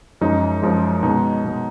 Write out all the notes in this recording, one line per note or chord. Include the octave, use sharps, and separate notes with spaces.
F#2 F3 G#3 D#4
F#2 F3 G#3
B2 D#4
G#3
B2 G#3